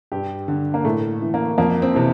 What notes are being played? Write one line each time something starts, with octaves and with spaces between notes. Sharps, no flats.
G2 G4
D3
A#3
A2 A3
E3
A#3
F2 A#3
C4
C3 E3